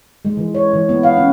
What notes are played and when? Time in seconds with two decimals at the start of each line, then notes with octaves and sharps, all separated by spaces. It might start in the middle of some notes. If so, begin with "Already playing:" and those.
0.25 G#3
0.37 E3
0.55 C#5
0.73 E3
0.89 B3
1.03 F5
1.17 C#4